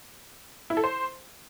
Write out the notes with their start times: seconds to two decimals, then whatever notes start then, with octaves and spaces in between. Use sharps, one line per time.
0.70 E4
0.77 A4
0.84 C5